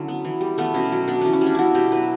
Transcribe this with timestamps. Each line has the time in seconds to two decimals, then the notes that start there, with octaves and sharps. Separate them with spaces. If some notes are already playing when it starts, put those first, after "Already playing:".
Already playing: D3 F#3 C#4 E4
0.08 B3
0.25 E3
0.41 G3
0.58 A3 B3
0.74 B2 C#4
0.92 F#3
1.08 B3 D4
1.21 E3 C#4
1.33 C#4
1.41 G3
1.46 D4
1.55 B3 E4 F#4
1.75 B2 G4
1.92 F#3 B4